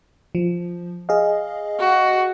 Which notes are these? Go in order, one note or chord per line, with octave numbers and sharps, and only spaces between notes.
F3
G#4 D#5 F5
F#4